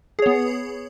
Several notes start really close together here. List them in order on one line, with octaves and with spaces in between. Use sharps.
G#4 C#5 B3